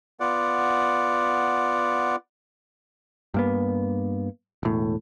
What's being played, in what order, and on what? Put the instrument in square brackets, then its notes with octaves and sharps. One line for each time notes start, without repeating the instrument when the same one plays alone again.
[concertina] B3 F4 D5 F#5
[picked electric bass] G2 A#3 B3
E1 A2